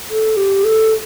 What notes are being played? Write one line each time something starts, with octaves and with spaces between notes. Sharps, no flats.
A4
G4
A4